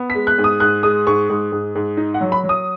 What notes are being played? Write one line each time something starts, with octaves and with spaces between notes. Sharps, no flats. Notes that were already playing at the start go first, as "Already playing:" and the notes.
Already playing: B3
B6
G#3
F#6
G#2
D#6
G#2 F#6
G#3 D#6
G#2 C#6
G#2
G#2
G#2
D#4
F#5
F#3
B5
F#3
D#6